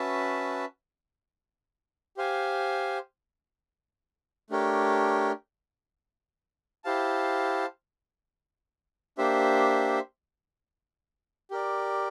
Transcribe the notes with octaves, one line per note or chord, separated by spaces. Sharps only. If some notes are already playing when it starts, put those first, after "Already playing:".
Already playing: C#4 F#4 B4 E5 A5
G4 C5 F5 G#5
A3 D4 G4 A#4 C#5
E4 G4 C5 F5 A5
A#3 D4 G4 C5 E5
G4 A#4 D5